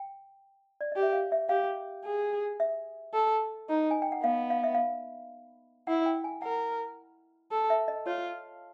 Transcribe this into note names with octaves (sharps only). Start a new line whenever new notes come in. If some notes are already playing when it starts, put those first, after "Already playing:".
Already playing: G5
D5
G4 D#5
E5
F5
E5
G4 F5
G#4
E5
A4
D#4
G#5
G5
F#5
B3 F5
F5
E5
F5
E4 F#5
G5
G#5
A#4 F#5
A4
E5
D#5
F4 C#5